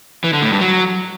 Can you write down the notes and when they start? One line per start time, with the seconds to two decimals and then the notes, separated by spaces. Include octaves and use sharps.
0.24 E3
0.33 D3
0.42 A2
0.51 G2
0.61 F#3